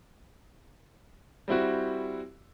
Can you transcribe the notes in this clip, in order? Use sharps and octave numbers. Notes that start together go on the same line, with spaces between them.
G3 C4 E4 F#4